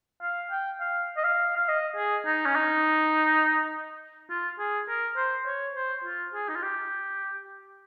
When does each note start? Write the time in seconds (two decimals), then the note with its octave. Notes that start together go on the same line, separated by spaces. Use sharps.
0.22 F5
0.51 G5
0.80 F5
1.17 D#5
1.24 F5
1.57 F5
1.68 D#5
1.96 G#4
2.26 D#4
2.46 C#4
2.56 D#4
4.30 F4
4.59 G#4
4.89 A#4
5.17 C5
5.46 C#5
5.75 C5
6.04 F4
6.34 G#4
6.49 D#4
6.56 F4
6.63 G4